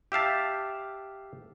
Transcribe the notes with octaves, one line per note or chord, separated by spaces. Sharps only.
G4 E5 F5 A5